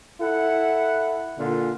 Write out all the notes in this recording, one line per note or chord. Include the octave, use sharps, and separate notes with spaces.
E4 A4 F#5
A#2 D3 F4